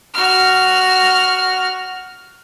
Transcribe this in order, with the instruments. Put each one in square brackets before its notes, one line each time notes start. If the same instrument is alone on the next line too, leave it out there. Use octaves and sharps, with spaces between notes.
[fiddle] F#4 F6